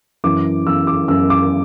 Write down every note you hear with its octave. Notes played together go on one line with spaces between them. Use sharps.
F#2 E3 D6
F#2 E3 E6
D6
F#2 E3 E6
D6